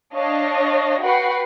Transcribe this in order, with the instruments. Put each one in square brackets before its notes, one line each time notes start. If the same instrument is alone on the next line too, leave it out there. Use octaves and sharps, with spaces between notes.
[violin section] D4 C#5 D#5 F5
F#4 B4 F#5 G5 B5 C7